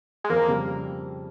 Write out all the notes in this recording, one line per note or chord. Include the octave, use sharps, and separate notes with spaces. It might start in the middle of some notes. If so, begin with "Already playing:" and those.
G#3
F2 A#3
C#3 G3